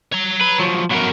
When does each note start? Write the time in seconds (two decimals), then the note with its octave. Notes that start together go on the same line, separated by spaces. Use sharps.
0.13 C#5 A#5
0.41 B4
0.60 F3 F#3
0.91 F#3 A3 B3 A#4